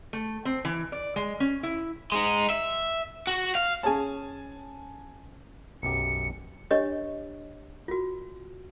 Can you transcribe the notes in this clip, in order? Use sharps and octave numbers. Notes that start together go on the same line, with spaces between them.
A3
C4
E3
D5
G#3
C#4
E4
G#3 D#4
E5
F#4
F5
C#4 G#4 C#5 G#5 A5
B1 F#2 G4 C#7
D4 G4 C#5 D#5
F4 F#4